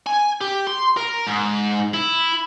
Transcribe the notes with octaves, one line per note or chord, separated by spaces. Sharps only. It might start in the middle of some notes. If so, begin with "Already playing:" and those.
G#5
G4
C6
A#4
G#2
E4